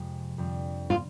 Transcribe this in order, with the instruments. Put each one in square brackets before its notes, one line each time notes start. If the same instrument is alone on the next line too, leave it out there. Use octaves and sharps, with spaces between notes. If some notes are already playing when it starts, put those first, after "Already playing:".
Already playing: [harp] F2 C3 F3 G#3
F2 D3 G3 C4
[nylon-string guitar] F4